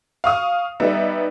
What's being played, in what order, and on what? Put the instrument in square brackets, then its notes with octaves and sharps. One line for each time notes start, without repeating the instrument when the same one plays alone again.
[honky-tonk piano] F5 C#6 D#6
G3 B3 D#4 E5